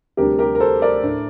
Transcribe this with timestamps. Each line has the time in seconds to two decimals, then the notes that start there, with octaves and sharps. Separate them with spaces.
0.17 D2 C3 G3 D4 G4 A#4
0.39 G4 A#4
0.55 A#4
0.60 A4 C5
0.82 A#4 D5
1.03 A2 A3 D4